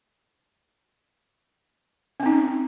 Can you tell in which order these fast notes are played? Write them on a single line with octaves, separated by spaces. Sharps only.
C#4 C4 D#4